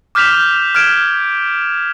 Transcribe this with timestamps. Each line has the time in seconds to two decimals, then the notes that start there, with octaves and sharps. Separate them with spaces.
0.15 D6 F6 G6 B6 E7 F7
0.75 F6 G#6 D7 E7